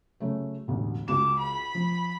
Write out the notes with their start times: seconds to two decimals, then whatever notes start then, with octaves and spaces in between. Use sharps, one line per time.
0.20 C#3 F#3 A3
0.68 E1 A1 D2
1.08 C#2 F#4 D6 E7
1.39 B5
1.75 F3